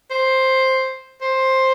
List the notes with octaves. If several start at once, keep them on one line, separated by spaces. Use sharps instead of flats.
C5
C5